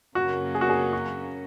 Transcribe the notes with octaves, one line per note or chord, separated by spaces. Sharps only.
F#2 C#3 F#3 A#3 C#4 F#4
G#4
F#4
G#4
F#4